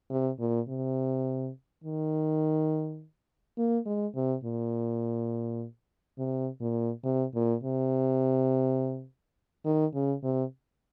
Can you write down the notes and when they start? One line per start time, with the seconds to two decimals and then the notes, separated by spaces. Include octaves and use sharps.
0.10 C3
0.40 A#2
0.69 C3
1.84 D#3
3.58 A#3
3.86 G#3
4.16 C3
4.44 A#2
6.19 C3
6.61 A#2
7.05 C3
7.34 A#2
7.63 C3
9.65 D#3
9.95 C#3
10.24 C3